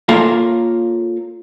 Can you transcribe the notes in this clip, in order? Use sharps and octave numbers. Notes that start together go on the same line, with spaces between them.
A#3 F4 A4 A#4 C#5 F5